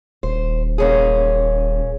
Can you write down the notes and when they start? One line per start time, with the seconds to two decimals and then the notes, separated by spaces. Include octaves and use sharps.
0.23 D#1 C5
0.78 A#3 C#4 G#4